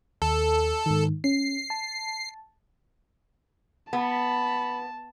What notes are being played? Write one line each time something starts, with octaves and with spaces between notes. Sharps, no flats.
D#2 A4
G#2 D#3
C#4 C7
A5
B3 A5 B5